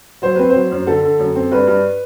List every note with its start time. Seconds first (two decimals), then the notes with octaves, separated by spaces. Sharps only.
0.22 F#3 C5
0.36 C4 B4
0.50 F#3 C5
0.71 F#2
0.86 D3 A4
1.03 D3
1.19 F#2
1.35 C4
1.52 G2 B4
1.67 G2